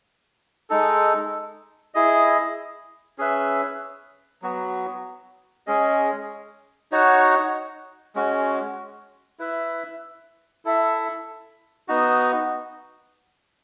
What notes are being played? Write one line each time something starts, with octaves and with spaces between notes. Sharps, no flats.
G#3 D#4 A4
E4 G#4 D#5
C#4 G#4 B4 E5
F#3 B3 F#4
G#3 C#4 G#4 D#5
D#4 F#4 C#5 F#5
G#3 C#4 F#4
E4 B4 E5
E4 A4 E5
B3 D#4 F#4